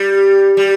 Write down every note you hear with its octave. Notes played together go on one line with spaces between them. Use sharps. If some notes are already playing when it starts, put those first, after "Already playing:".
Already playing: G3
G3